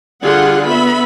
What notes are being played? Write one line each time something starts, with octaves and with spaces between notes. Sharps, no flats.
D3 G3 F4 G#4 F#5
B3 E5 B5